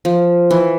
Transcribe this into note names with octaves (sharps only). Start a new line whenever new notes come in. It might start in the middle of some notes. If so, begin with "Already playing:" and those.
F3
E3